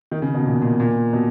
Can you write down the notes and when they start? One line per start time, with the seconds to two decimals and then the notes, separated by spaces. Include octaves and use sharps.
0.12 D#3
0.22 C#3
0.34 B2
0.45 A#2
0.62 A#2
0.80 A#2
1.13 B2